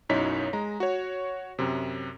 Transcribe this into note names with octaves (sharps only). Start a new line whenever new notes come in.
B1 F#2 D#4 E4 C#5 B6
G#3 A#5
F#4 C#5
F#2 C3